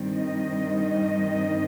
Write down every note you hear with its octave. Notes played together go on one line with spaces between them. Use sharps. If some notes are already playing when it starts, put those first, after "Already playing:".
Already playing: G2 D#3 G3 C4
D#5